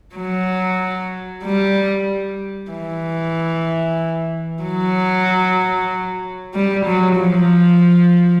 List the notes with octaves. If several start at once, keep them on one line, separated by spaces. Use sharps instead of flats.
F#3
G3
E3
F#3
G3
F#3
F3